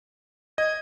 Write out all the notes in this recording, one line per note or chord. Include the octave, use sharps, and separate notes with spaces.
D#5 G#6